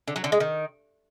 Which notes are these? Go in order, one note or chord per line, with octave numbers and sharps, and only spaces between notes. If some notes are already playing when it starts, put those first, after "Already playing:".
D3
F#3
D3
G#3
D#3